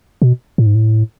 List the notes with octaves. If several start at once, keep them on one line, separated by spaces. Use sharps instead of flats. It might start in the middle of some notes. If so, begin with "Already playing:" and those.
B2
A2
G#2
A2